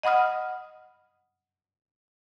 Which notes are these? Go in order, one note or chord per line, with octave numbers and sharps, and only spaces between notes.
D#5 F#5 B5 D#6 F6